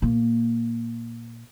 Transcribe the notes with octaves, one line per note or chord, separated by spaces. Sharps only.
A#2 A#3